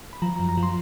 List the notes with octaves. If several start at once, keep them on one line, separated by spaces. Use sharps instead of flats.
B5
F3 A#5
F#2 A#5
A#5
F3
C6